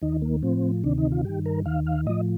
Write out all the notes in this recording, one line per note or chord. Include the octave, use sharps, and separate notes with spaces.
D#2 D#3 D#4
A#3
A2 F3 C4
D2 C3 D#3 D4
D#4
F4
G2 D#3 G4
A#4
D#2 D#3 F5
F5
A2 F3 D#5